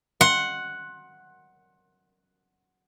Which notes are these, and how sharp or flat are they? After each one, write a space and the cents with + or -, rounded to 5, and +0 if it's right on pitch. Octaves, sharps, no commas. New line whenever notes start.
F#5 +0 C6 +25